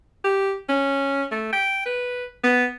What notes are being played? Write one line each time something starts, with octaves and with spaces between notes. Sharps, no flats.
G4
C#4
A3
G5
B4
B3